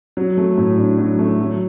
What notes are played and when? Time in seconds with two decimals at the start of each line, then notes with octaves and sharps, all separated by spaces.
0.17 F#3
0.37 A3
0.58 A2
0.78 D4
0.98 F#3
1.19 A3
1.40 F#3